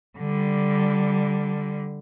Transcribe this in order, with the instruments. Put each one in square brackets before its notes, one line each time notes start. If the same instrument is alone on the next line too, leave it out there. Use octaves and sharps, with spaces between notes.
[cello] D3 G3